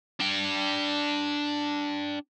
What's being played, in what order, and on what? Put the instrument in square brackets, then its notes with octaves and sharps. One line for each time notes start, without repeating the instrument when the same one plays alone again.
[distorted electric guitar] D4 G5